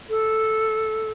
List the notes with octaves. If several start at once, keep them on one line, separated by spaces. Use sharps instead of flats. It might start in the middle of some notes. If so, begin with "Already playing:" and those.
A4